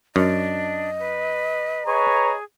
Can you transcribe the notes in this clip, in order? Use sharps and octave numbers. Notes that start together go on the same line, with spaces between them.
F#2 D4 D#5
B4
G#4 B4 C#5 A#5